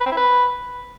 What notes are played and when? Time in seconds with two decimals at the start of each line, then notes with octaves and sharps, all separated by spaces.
0.01 B4
0.06 C4
0.12 E4
0.17 B4